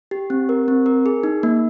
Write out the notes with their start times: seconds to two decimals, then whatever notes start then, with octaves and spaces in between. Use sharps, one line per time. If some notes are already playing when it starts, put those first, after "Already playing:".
0.11 G4
0.30 C4
0.49 A#4
0.68 C4
0.86 A#4
1.06 G#4
1.23 D#4
1.43 A#3